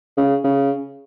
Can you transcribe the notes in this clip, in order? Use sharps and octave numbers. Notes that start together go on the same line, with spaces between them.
C#3
C#3